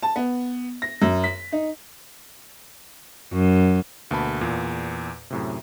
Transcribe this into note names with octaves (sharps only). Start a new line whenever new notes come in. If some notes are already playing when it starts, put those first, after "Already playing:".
A5
B3
A#6
F#2
B6
D#4
F#2
D2 B2 A#3 A5 B5
E2 A#2
F#2 A2 C3